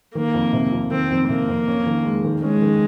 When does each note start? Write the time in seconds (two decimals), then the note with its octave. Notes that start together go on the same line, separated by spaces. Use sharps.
0.15 D#3 A#3
0.34 F2
0.53 C3
0.72 F2
0.91 D#3 C4
1.10 F2
1.29 C3 A#3
1.48 F2
1.67 C#4
1.87 D#3
2.05 G#3
2.24 D#3
2.42 G#3 C#4
2.62 D#3